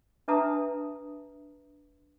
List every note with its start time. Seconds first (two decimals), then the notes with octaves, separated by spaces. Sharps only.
0.28 D4 B4 E5 A5 A#5 D#6